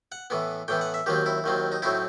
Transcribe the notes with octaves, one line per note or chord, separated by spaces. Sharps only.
F#5
A2 E3 B3
A2 E3 B3 G5
F#5
E5
D#2 D#3 F#3 C4 G4
E4
D#2 D#3 F#3 C4
D#4
A2 F#3 C4 D#4 E4